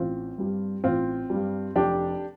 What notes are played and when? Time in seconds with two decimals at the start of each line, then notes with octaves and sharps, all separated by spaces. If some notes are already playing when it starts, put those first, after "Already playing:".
Already playing: A1 C4 F4
0.38 G2 G3
0.84 A1 C4 F4
1.30 G2 G3
1.75 F1 D4 G4